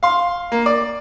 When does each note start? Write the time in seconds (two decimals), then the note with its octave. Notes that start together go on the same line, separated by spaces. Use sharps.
0.03 F5 C6
0.52 A#3
0.66 D5